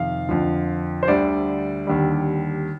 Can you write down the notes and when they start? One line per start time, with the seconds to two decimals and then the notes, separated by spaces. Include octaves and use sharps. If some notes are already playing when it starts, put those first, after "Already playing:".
Already playing: F2 C3 D#3 F5
0.29 F2 D3 F3
1.03 C5
1.08 D2 D3 G3 D5
1.87 D#2 D3 G3